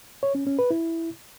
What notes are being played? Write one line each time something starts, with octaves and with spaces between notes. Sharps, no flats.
C#5
C#4
C#4
B4
E4